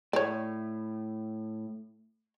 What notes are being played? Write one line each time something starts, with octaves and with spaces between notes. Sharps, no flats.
A2 C#5 D5